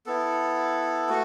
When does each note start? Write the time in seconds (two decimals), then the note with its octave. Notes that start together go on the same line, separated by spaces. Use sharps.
0.06 B3 E4 A4
1.09 A3 F#4